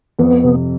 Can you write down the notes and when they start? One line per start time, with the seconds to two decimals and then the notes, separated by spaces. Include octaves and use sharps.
0.19 F2 B3
0.44 C3